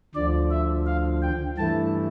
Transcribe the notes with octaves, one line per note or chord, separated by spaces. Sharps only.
D2 D3 F3 D5
E5
F5
G5
G2 E3 A3 E4 A5